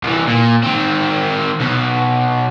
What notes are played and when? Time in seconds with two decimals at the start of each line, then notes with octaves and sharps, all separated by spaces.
0.04 C2 E3
0.27 A#2
0.63 D#3 C4
1.60 B1 B2